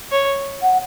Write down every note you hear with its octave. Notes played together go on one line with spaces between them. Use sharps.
C#5
F#5